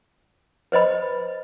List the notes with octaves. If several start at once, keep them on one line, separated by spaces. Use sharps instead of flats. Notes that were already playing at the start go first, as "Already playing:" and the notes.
B4 C5 D#5 B5